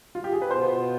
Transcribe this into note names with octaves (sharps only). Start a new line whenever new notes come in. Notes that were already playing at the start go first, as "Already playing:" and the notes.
F4
G4
G#4
B4
B2 B3 F4 C5